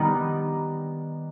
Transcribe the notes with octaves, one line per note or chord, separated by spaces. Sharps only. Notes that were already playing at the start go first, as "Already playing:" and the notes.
Already playing: D#3 G3 B3 D#4